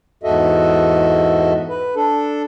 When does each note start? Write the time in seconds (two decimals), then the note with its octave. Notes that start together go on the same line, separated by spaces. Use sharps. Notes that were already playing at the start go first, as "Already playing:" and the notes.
0.23 E2 G#2 F#4 A4 D#5 E5
1.70 B4
1.96 D4 A4